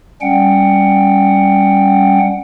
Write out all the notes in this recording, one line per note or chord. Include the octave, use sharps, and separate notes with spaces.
G3 C#4 F#5 G5